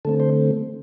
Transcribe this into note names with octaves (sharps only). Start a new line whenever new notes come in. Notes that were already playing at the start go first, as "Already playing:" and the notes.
D3 A3 C4 A4
C5